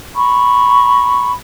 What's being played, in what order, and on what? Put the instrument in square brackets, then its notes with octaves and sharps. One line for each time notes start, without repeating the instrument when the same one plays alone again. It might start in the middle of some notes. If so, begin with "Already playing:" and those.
[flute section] A#5 B5 C#6